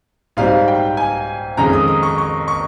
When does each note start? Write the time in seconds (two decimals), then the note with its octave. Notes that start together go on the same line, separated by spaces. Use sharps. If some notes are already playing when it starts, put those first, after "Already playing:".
0.37 G#2 G3 C4 F5
0.68 G5
0.97 G#5
1.57 F2 D#3 G#3 C#4 A#5
1.73 D#6
1.88 D#6
2.03 C#6
2.18 C#6
2.48 C#6